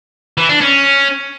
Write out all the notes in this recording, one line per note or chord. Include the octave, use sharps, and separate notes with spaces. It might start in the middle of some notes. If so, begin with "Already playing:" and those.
E3
D4
C#4